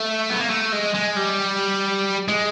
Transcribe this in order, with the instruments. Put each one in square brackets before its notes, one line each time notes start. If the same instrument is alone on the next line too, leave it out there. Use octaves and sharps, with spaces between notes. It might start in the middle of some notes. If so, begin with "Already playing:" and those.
Already playing: [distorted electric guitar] A3
B3
A#3
A3
G#3
G#3
G3
G#3